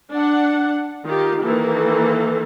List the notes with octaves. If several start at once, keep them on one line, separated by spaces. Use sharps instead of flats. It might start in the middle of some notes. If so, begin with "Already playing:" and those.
D4 F#5
D#3 F4 G4
D#3 E3 A#3 A4